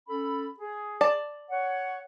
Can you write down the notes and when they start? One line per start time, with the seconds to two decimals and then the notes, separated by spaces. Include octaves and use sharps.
0.09 C#4 A4 B5
0.59 G#4
1.01 D5 A5
1.50 C#5 F#5